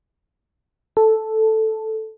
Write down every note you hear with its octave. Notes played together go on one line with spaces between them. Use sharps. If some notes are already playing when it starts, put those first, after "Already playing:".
A4